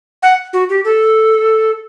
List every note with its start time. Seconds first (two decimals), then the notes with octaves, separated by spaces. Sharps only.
0.23 F#5
0.53 F#4
0.70 G4
0.85 A4